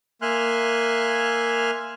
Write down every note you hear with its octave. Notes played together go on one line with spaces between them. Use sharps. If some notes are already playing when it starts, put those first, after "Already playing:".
A#3 E5 G#5 C6 F6 F#6